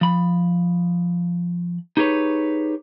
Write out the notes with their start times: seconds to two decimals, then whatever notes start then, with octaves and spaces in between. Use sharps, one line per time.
0.01 F3 B5
1.97 D#4 G4 G#4 B4 C#5